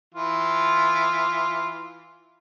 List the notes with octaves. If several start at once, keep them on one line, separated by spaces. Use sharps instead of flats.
E3 F4